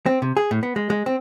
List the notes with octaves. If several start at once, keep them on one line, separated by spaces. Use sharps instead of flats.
C4
C3
G#4
A2
B3
G#3
G#3
C4